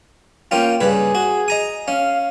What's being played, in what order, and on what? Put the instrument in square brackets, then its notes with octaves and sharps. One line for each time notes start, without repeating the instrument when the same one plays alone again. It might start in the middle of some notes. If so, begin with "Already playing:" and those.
[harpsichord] A#3 C#4 F4 [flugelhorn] G5
[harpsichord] G2 C#3 B4 [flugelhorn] G#4
[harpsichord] F#4
D#5 A#5 D#6
[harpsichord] C#4 [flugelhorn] F5